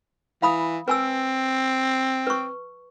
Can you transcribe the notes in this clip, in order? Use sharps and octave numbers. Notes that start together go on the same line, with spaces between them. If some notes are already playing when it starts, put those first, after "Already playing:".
E3 F5 B5 D#6
C4 B4 G#5 E6
B4 C#6